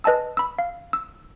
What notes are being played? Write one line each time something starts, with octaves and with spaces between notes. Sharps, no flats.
B4 D#5 G#5 A5 E6
B5 E6
F5
E6